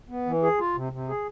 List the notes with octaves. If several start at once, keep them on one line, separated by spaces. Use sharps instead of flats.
B3
E3
G#4
F4
C3
C3
G#4